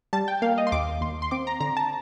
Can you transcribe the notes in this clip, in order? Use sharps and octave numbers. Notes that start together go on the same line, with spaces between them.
G3 A5
G5
A#3 F5
D#5
C6
D#2 D6
D#2 C6
C6
C4 D6
A#5
D3 A#5
A5